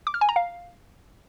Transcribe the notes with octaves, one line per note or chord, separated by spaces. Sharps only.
D6
F6
G#5
A#5
F5